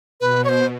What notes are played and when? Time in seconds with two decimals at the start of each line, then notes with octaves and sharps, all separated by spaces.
0.20 B2 B4
0.44 C#5
0.49 C5